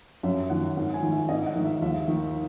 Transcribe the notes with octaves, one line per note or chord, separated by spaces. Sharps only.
F#2 E5
D#3 F#5
G#2 F#5
G#5
D#3
E5
G#2 D#5
F#5
D#3
E5
D#2 E5
D#3